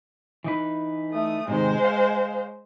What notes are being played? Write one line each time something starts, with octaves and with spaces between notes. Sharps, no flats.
E3 D#4 B4
A3 D#6
G#2 C3 D#3 G#3 C5
C#5 F5